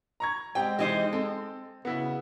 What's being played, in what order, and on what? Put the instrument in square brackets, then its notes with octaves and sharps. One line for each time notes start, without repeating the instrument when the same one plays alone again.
[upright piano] A#5 C#6 G#6
[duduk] G#3 [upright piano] C4 G4 [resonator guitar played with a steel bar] G5
[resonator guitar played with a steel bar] E3 D#4 C5 [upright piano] G4
[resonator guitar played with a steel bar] C4 [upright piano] A4
[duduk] C#3 [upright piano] B3 E4 F#4